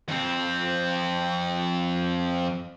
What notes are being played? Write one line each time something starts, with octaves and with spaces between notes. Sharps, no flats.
F2 C4